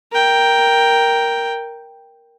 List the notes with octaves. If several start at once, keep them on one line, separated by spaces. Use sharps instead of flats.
A#4 G5